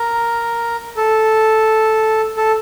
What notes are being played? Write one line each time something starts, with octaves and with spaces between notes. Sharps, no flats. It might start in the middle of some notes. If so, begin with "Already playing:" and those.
Already playing: A#4
A4
A4